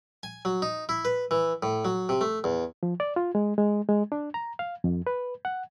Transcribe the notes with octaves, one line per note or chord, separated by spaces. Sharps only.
G#5
F#3
D#4
E4
B4
E3
A2
F#3
C3
A3
E2
F3
D5
F4
G#3
G#3
G#3
D4
A#5
F5
F2
B4
F#5